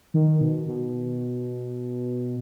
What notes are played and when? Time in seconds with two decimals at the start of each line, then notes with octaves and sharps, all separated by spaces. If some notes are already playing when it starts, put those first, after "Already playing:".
0.14 D#3
0.41 B2
0.68 B2